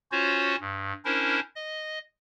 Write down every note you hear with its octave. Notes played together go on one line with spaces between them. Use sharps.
C#4 F4 F#4 C5 C#5
G2
C#4 D4 E4 A#4 C5
D#5